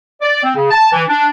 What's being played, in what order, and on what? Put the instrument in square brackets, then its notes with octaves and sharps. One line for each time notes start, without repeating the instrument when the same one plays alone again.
[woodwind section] D5
C4
C#3
A5
E3
D4